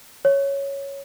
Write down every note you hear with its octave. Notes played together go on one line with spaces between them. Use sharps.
C#5